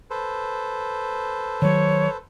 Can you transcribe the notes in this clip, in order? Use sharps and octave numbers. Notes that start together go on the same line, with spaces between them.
A4 B4 C5
D#3 F#3 C#5